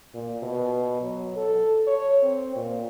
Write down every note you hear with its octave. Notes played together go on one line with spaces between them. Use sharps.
A#2
B2
F#3
A4
C#5
C4
A#2